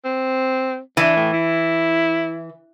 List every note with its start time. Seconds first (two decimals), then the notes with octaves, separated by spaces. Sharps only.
0.05 C4
0.97 E3 D4
1.17 A2
1.33 E4